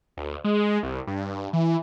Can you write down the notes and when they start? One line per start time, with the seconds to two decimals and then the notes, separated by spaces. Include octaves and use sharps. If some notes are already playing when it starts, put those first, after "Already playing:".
0.17 D2
0.44 G#3
0.83 C2
1.07 G2
1.53 E3